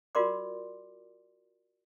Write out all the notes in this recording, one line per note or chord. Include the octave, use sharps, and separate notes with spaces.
F4 F#4 A#4 D5 C6 D6